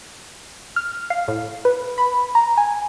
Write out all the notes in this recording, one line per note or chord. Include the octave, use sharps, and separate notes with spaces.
F6
F5
A2
B4
B5
A#5
G#5